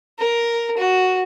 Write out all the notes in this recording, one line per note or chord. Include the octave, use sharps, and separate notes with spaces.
A#4
F#4